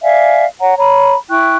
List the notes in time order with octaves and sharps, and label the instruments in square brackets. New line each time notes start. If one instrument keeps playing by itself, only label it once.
[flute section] D5 E5 F5 G#5
C#5 F#5 A#5
C#5 A#5 B5
E4 G5 C#6 F#6